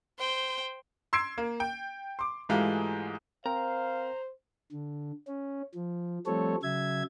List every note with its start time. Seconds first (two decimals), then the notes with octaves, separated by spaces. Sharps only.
0.19 C5 G5
1.13 C6 E6 G#6 C7 D7
1.38 A#3
1.60 G5
2.19 C6 D6
2.49 G#2 E3 G#3 A3 F4 G4
3.46 C4 A#4 C5 F5 G5 A#5
4.72 D3
5.27 C#4
5.75 F3
6.26 F3 G3 A3 C4 A4 C#5
6.63 C#3 F#3 E5 G#6